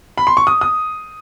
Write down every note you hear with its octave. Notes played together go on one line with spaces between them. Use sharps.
B5
C6
C#6
D#6
D#6